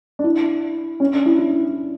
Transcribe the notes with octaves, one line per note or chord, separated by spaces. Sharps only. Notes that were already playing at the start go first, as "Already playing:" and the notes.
D4
E4
C#4
D4
E4
E4